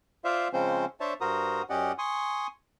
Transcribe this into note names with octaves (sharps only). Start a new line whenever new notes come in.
F4 C5 D5 E5 F5
C#3 F3 G#3 C4 C#4 C5
D4 C5 C#5 E5 A5
G2 F#4 A#4 C5 A#5 D#6
F#2 C#4 G4 D5 D#5 F#5
G#5 C6 C#6 D#6